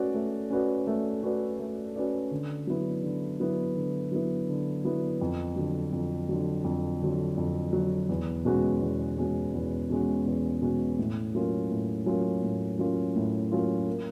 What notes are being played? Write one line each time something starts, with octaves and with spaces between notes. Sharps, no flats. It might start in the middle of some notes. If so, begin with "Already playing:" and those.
Already playing: A3 C#4 F#4 B4 D5
A3
C#4 F#4 B4 D5
A3
C#4 F#4 B4 D5
A3
C#4 F#4 B4 D5
D3
F#3 B3 E4
D3
F#3 B3 E4
D3
F#3 B3 E4
D3
F#3 B3 E4
F2
D3 F#3
F2
D3 F#3
F2
D3 F#3
F2
D3 F#3
E2
B2 G#3 C#4 F#4
E2
B2 G#3 C#4 F#4
E2
B2 G#3 C#4 F#4
E2
B2 G#3 C#4 F#4
A2
F#3 A#3 C#4 F4
A2
F#3 A#3 C#4 F4
A2
F#3 A#3 C#4 F4
A2
F#3 A#3 C#4 F4
A#3